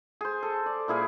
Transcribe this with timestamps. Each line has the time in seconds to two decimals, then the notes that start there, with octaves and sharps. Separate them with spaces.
0.21 G#4 C5
0.43 A4
0.66 D5
0.88 A#2 E4 G#4 A#4